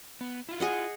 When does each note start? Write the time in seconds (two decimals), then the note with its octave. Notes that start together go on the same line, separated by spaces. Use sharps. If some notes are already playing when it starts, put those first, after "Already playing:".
0.21 B3
0.49 E4 F4
0.60 G#4 D#5 F#5